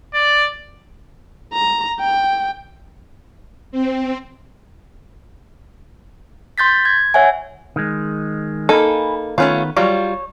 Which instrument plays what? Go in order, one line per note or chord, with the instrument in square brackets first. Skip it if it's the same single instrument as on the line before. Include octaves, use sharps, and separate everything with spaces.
[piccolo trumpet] D5
[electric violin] A#5
G5
[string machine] C4
[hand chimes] C6 G6 A6 B6
G#6
C#5 E5 F#5 G#5
[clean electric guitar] D#3 G#3
[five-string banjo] A#3 D#4 A4 [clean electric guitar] G#5 B5
[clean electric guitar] D#3 B3 B4 [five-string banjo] A3 C#4 F4
[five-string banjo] F#3 G3 F4 [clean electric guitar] C#5